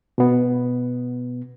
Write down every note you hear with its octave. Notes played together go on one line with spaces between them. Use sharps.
B2 B3